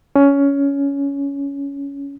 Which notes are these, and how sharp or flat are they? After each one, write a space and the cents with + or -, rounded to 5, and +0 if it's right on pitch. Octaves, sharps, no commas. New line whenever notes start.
C#4 +15